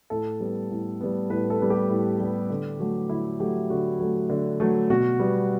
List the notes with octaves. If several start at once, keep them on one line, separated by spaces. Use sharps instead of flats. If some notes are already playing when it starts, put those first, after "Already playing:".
A2 A4
G3 B3
A2
G3 B3
A2 B4
A4
G3 B3
G4
A2
G3 B3
D3
F#3 A3
D3 E4
F#3 A3 G4
D3 F#4
F#3 A3
D3
F#3 A3
B2 F#4
G3 B3